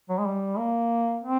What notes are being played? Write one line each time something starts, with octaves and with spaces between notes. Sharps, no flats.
F#3
G#3
G3
A#3
C4